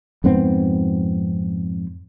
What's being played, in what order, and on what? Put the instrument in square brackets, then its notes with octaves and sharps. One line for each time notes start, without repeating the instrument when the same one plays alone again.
[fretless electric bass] F2 G#2 B3 C4